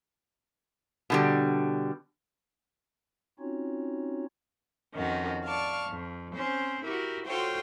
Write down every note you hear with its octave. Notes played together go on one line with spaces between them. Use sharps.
B2 D3 G3
C4 C#4 D#4 F4 F#4 C#5
F2 D#3 C#4 F#4
D5 F5 A5 C#6
F2
C4 C#4 C5
E4 F#4 G4 A#4
F4 F#4 A4 C5 C#5 G5